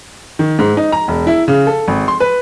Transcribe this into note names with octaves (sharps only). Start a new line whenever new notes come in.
D#3
G#2
D#4
A#5
E1
E4
C#3
A4
G#1
C6
B4